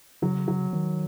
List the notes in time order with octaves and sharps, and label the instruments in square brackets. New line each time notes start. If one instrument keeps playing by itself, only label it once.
[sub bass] C#3 [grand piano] F#3
[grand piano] F#3
[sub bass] D#3